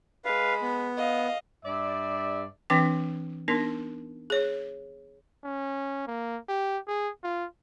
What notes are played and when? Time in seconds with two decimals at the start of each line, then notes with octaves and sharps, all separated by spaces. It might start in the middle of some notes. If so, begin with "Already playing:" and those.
0.25 G#3 B4 F5 B5
0.62 B3
0.97 D#5 F5
1.65 G2 D5 E5
2.70 E3 C4 D4 B4 G5
3.48 B3 D4 D#4 A#4
4.30 G#4 C#5
5.44 C#4
6.07 A#3
6.49 G4
6.88 G#4
7.23 F4